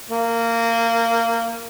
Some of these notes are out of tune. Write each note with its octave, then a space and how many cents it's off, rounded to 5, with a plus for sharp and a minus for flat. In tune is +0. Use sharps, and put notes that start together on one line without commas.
A#3 -20